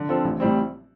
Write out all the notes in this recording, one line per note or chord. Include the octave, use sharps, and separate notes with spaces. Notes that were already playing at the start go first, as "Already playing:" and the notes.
Already playing: D3
F3 C4 F4 A4
A1
A2 G3 C4